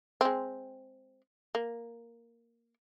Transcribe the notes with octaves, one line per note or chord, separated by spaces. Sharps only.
G#3 C4
A#3